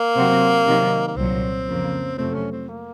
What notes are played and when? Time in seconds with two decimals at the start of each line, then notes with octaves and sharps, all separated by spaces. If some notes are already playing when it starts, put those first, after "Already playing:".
Already playing: A#3
0.15 C3 F#3 C4 F#4 C5
0.65 C3 D#3 F#3
1.08 A#3
1.16 C2 A#2 F#3 C4
1.67 F2 C#3 F3 A#3
2.17 F2 C3 F#3 A3 C4
2.34 C#4
2.52 C4
2.68 A#3